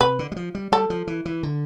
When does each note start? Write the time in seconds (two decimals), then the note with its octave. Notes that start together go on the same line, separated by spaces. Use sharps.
0.01 C3 B4
0.19 D3
0.32 G3
0.36 F3
0.55 G3
0.72 G3 A4
0.90 F3
1.07 E3
1.25 E3
1.43 D3